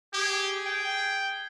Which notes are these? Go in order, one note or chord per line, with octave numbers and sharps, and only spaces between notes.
G4 G#4
G5